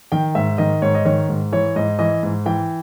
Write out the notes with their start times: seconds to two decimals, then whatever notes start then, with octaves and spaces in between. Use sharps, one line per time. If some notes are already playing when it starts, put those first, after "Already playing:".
0.12 D#3 G5
0.35 G#2 E5
0.58 D#3 D#5
0.82 G#2 C#5
0.95 D#5
1.05 D#3 C#5
1.29 G#2
1.52 E3 C#5
1.76 G#2 D#5
1.99 E3 D#5
2.23 G#2
2.46 E3 G5